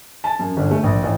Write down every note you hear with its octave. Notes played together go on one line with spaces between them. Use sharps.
A5
F#2
G1
A3
A#1
A1